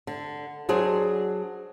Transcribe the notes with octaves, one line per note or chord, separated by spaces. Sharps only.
D3
F#3 D4 G#4 C5